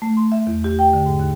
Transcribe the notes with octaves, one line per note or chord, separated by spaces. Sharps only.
A3
C6
E5
E2
G4
G5
D3
G#2
D#2